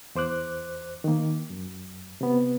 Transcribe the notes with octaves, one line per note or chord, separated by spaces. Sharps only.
E2 C5 D6 F#6
D#3 A#3
F#2
C3 B3